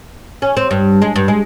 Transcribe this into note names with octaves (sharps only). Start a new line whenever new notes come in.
C#4
C4
G2
G#3
G2
G#3